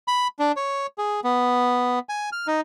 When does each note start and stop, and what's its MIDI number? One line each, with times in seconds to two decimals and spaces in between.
0.08 0.27 83
0.39 0.52 62
0.56 0.87 73
0.98 1.20 68
1.24 1.99 59
2.09 2.30 80
2.32 2.47 89
2.47 2.61 63